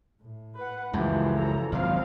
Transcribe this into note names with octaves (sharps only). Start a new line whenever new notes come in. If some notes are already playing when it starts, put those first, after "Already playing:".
A2
B4 F#5
C#2 F#2 E3 F3 A3 G4
A4 A#5
G#1 C3 F3 F#3 C4 F5